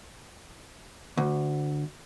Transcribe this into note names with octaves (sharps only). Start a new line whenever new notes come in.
D2